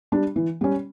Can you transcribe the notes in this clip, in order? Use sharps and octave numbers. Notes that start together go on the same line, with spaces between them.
G3 D4
E3
G3 C#4